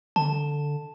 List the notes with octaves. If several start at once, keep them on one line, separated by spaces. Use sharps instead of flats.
D3 A5